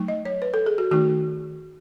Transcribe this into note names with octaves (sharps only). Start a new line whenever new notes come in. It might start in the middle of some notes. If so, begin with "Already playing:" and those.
Already playing: F#3 A3 D#4
D#5
C#5
B4
A4
G#4
F#4
D#3 A3 D#4 F#4